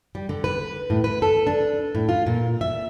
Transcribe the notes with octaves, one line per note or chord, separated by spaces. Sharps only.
G3
D3
B4
A2
B4
A4
D4
A2
F4
A#2
E5